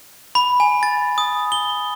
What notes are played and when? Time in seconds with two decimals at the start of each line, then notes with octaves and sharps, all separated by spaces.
0.35 B5
0.60 G#5
0.83 A6
1.18 D#6
1.52 G7